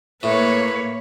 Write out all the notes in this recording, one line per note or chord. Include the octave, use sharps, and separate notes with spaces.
A2 A#3 B4 C#5